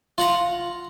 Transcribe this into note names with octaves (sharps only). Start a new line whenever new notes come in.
F4 F#5 A#5